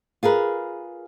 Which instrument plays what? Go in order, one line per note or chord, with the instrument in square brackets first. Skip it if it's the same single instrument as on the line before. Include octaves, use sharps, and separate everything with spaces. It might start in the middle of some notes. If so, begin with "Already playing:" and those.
[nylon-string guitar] F4 G#4 A#4 B4